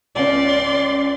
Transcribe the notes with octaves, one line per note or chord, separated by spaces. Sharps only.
C#2 C#4 D5 C6